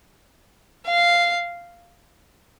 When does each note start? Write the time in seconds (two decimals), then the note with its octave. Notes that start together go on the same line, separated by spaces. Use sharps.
0.86 F5